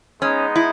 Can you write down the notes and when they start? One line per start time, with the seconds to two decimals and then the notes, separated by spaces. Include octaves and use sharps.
0.21 G#3 B3 C#4 D#4
0.56 E4